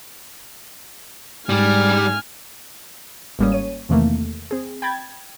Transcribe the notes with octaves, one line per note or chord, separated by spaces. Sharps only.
G#2 G3 G4 G#5 F6
G1 G#2 G3 A#3 C#4 D#6
C#5 D#7
E2 C3 D#3 E3 A3 A#3
C4 G#4
G5 B5 G#6 A6